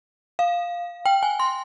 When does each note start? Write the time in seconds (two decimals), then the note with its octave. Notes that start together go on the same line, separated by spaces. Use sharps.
0.39 F5
1.06 G5
1.23 G#5
1.40 C6